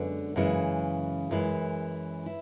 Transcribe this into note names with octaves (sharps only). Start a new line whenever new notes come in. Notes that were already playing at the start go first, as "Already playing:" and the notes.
Already playing: F#2 D3 G#3 B3
F#2 C#3 E3 G#3
F#2 E3 G#3
E4